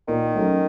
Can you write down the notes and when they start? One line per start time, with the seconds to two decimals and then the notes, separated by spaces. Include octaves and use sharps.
0.08 A#2 D#3
0.35 F#3 A3 C#4